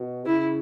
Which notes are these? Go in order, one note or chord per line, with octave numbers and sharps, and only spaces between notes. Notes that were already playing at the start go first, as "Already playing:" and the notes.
Already playing: B2
C#3 E4